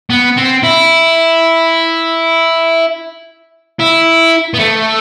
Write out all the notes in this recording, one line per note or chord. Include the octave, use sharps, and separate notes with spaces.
B3
C4
E4
E4
B3
A3